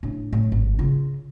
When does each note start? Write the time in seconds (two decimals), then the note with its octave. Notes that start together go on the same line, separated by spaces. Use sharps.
0.03 A2 D4
0.33 A2
0.52 G#1
0.79 C#3 F4